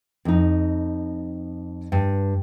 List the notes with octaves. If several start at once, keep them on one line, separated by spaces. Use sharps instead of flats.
F2 D#4
G2